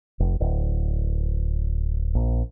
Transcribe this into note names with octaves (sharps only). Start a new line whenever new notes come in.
F1
D1
A#1